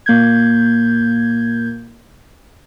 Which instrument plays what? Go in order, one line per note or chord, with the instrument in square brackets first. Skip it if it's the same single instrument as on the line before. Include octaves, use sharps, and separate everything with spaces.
[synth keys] A#2 A#3 G6 G#6